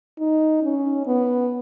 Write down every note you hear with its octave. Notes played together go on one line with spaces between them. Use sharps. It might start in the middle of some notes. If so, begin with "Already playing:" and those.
D#4
C#4
B3